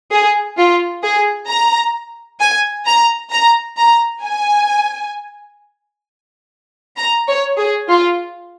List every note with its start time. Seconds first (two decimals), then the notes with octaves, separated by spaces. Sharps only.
0.12 G#4
0.57 F4
1.03 G#4
1.49 A#5
2.40 G#5
2.86 A#5
3.32 A#5
3.78 A#5
4.23 G#5
6.97 A#5
7.28 C#5
7.57 G#4
7.88 F4